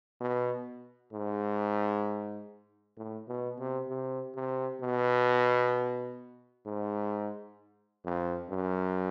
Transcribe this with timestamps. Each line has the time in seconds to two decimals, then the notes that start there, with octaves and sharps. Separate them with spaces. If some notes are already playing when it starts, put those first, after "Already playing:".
0.21 B2
1.13 G#2
2.97 A2
3.28 B2
3.59 C3
3.89 C3
4.35 C3
4.82 B2
6.66 G#2
8.05 F2
8.50 F#2